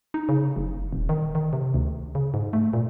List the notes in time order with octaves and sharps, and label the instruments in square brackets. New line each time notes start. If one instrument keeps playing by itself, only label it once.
[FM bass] D#4
C#3
F#1
D#1
D#3
D#3
C3
D2
C#3
G#2
A3
A#2